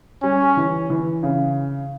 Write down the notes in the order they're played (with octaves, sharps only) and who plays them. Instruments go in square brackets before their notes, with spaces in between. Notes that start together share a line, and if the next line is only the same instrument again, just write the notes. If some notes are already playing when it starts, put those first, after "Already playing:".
[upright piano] G3 [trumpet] C#4
[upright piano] E3
E3
C#3